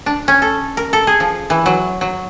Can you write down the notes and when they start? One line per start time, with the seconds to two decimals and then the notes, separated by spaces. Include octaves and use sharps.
0.06 D4
0.28 C#4
0.42 A4
0.77 A#4
0.93 A4
1.07 G#4
1.20 F3
1.50 E3
1.66 F#3
2.01 F#3